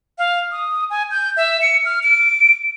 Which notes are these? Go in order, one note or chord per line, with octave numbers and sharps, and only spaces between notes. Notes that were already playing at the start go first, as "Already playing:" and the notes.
F5
D#6
G#5
G6
E5
C#7
F6
D7